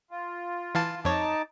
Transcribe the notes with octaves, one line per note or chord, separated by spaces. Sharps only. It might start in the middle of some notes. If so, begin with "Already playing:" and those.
F4
E3 F5 A5
F2 D#4 C#5 A5 D6